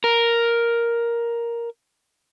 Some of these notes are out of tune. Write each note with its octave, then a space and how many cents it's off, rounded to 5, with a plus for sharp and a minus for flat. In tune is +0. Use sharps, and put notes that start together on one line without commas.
A#4 +5